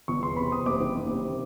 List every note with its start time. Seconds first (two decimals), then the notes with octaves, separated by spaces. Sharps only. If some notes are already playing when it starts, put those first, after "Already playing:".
0.08 G1 C#6
0.22 E2 C6
0.36 C3 B5
0.52 C3 D#6
0.65 F#1 D6
0.80 D#3
0.95 F#1
1.10 C3
1.25 D#3